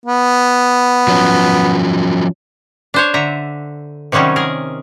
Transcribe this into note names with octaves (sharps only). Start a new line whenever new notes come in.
B3
F3 F#3 C#4
D4 C5 C#5
D3 E5 A#5
C3 D#3 F#3 G3 C#4
G#4 A#4